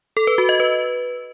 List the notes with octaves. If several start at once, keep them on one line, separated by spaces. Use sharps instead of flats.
A4
B4
F#4
D#5
B4